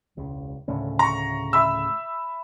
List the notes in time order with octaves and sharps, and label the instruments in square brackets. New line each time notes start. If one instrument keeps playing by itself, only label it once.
[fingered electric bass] E1 C#2
D2 A2 C#3
[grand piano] A#5 C#6
E5 B5 E6